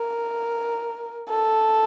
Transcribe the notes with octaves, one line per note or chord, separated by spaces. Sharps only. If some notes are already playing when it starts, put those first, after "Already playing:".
Already playing: A#4
A4